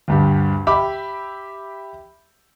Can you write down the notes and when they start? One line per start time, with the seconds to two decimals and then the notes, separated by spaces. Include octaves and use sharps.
0.08 D2 G2 G4
0.67 G4 E5 B5 D6